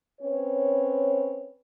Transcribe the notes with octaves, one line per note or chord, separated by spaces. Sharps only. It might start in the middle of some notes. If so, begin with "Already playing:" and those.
C4 C#4 B4 C#5